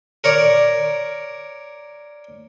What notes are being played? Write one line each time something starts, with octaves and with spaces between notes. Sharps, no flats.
A#4 C#5 D5